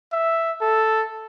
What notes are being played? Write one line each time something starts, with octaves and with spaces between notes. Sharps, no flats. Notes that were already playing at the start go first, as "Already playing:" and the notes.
E5
A4